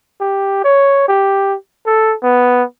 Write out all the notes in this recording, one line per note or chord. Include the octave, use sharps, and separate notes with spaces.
G4
C#5
G4
A4
B3